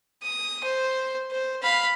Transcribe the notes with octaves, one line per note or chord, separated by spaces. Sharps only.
D#6
C5
C5
F5 B5